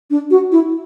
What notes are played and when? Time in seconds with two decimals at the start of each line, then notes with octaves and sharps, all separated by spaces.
0.10 D4
0.31 F#4
0.52 E4